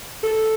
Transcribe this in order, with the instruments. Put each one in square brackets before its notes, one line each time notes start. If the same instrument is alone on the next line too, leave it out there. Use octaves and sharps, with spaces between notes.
[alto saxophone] A4